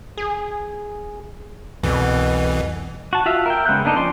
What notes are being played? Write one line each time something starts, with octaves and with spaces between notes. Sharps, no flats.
G#4
C2 F2 B2 E3
F#4 A5
F4 F#4 E5 F5
A#4 E5 G5
C#3 G#3 B3 F#6 G6
A#3 B3 D4 D#4 A4
F3 C#4 D5 C6